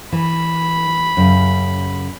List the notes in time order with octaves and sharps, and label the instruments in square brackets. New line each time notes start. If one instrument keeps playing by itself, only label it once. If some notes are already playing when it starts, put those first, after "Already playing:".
[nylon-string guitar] E3 [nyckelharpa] B5
[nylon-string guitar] F#2 C#3